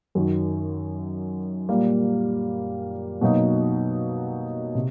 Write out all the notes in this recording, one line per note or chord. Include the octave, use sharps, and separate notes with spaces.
F#2 D#3 F#3
A#2 G3 A#3
B2 F#3 A#3 D#4
C3